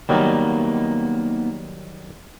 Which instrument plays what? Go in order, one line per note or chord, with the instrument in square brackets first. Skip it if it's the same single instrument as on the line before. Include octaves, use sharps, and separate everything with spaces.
[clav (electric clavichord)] D#3 F#3 G3 [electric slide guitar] A#3 B3 D#4